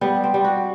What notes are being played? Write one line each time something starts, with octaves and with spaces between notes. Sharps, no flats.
G3 B3
C4
G3
F#4